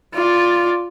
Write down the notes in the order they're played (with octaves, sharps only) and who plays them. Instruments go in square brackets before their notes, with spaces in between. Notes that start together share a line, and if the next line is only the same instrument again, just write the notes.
[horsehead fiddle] F4 D5